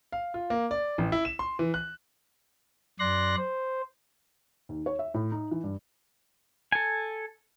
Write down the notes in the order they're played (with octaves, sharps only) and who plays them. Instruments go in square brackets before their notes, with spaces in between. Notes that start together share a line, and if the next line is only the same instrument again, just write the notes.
[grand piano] F5
F4
A#3
D5
A1
E4
E7
C6
E3
F#6
[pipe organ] F#2 D5 C6 F#6 A#6
C5
[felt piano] D#2
C#5
E5
A2
D#4
E3
G2
[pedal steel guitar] A4 G#5